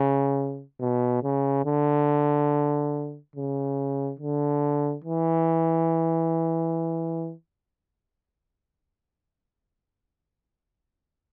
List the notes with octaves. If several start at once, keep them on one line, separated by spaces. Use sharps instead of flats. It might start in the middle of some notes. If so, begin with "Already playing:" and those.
Already playing: C#3
B2
C#3
D3
C#3
D3
E3